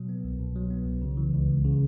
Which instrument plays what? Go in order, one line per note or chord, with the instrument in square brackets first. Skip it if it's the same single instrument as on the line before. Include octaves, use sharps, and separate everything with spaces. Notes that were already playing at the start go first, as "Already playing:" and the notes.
Already playing: [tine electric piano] B2 F#3
B3
C2
B2
F#3
B3
C2
C#3
E3
C#2
C#2
C#3